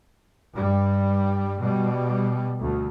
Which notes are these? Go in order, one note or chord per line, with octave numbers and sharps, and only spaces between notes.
G2 G3
B2 G3
D2